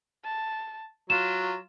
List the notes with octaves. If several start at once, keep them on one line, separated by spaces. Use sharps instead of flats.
A5
F#3 F4 E7